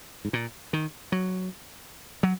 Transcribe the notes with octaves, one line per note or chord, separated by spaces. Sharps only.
G#2
A#2
D#3
F#3
F#3